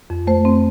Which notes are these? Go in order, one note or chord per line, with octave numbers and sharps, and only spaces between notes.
F2
A3 C5
C4